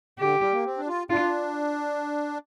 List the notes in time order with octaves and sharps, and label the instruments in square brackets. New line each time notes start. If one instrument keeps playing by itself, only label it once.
[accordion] D3 [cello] G4
[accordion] G3
A#3
C4
D4
F4
[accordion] D4 [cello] F4